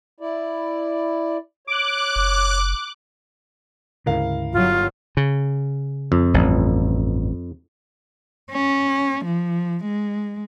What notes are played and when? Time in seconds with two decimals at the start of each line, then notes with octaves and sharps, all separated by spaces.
0.20 E4 D5
1.67 C#5 D6 F#6
2.16 F#1
4.06 D2 G#2 C#3 E4 A#4 F5
4.53 G1 F#3 F4
5.17 C#3
6.12 F2
6.34 A1 G2
8.51 C#4
9.25 F3
9.84 G#3